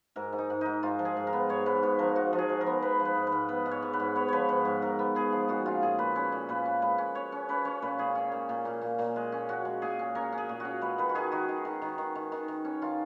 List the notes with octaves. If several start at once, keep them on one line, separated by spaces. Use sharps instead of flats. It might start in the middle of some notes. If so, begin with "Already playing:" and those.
G#2 A#4
G#2
D#4
G#2
G#2 D#4
G#2 F4
F3
G#4
G#2
A#4
B3
G#2 C#5
G#2 B4
G#2 B4
F3 A#4
F3 F#4
F3
G#4
F3
A#4
B3
B3 B4
F3
B4
G#2
B4
G#2
B3 B4
G#2
C#5
G#2
B4
G#2
B3 C#5
F3 B4 C#5
G#2 B4
G#2
G#2 A#4
B3
B3 G#4
F3
A#2 F#4
C#4 F4
A#2 G#4
A#2 B4
C#4 B4
A#2
A#2 B4
C#4
G#3 B4
C#4
C#4 C#5
C#4
C#4 B4
C#4 C#5
A#2 B4
A#2 G#4
C#4
A#2
A#2
A#2
A#2
A#2
G#3
C#4
C#4 F#4
G#3
A#2 G#4
C#4
C#4 A#4
C#4
G#4
A#2
C#4 F#4
G#3 B4
D#3 B4
F#4
D#3 G#4
D#3 F#4
D#3
D#3
D#3
D#3
D#3
D#3
D#3
C#4
D#3 F4